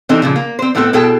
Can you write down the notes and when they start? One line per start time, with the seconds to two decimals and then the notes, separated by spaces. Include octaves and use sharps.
0.09 C3 E3 C4 D#4 A4
0.22 A#2 C#3 F3
0.36 A#3
0.59 C4 C5
0.75 A2 A3 B3 C4 E4 A4
0.93 B2 E4 G#4 A4 G5 A5